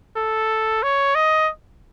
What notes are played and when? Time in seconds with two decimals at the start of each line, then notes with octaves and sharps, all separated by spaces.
0.16 A4
0.83 C#5
1.15 D#5